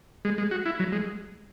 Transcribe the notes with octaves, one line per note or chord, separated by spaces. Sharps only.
G#3
G#3
F#4
E4
F#3
G#3